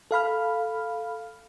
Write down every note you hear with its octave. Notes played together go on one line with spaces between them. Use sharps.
A4 F5 B5 F6